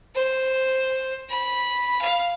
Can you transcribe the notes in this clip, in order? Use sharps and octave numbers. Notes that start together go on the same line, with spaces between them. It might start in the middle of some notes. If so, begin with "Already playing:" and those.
C5
B5
F5